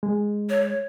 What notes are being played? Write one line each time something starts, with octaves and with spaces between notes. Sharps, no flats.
G#3
C#5